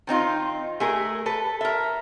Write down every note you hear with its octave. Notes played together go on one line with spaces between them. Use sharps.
D#3 C4 D#4 F4
A3 G#4 A#4
A4 B4
A#4 E5